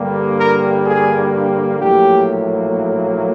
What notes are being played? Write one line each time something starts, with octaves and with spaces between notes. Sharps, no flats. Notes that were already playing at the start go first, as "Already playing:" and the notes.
Already playing: G2 D3 G3 A#3
A#4
G#4
A#1 A2 F#3 A#3 G4